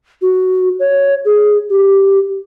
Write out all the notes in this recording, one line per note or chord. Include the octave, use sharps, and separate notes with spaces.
F#4
C#5
G#4
G4